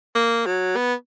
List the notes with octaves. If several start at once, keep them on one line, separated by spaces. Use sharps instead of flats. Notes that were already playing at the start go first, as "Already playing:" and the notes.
A#3
F#3
B3